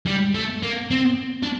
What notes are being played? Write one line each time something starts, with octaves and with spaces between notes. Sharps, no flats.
G3
A3
A#3
C4
D4